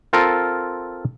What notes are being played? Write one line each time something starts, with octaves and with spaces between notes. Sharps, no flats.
C4 F4 A4 A#4